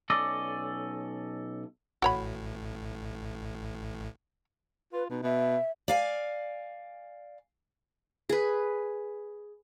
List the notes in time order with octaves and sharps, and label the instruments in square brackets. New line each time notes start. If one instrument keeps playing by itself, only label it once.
[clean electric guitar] B1 C#4 A4 D5 D#5
[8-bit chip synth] A1 A2 [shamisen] F#4 C#5 B5
[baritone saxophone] F4 [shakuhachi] B4
[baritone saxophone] B2 [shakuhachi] D#4
[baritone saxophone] B2 [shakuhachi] E5
[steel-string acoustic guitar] D5 F5 G#5
[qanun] G#4 B4